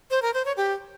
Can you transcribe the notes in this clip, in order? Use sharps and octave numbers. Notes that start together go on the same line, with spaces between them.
C5
A#4
C5
C#5
G4